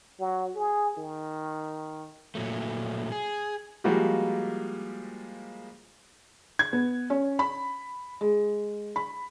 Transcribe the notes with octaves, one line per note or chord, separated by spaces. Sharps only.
F#3
G#4
D#3
A#2 F#3 A3
G#4
F3 G3 G#3 A#3 F#4 G4
G#6
B3
C#4
B5
G#3
B5